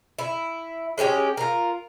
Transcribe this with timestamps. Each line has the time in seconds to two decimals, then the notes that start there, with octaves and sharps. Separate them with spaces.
0.19 E4
0.98 G#3 C#4 D4 G4
1.37 F4 A#4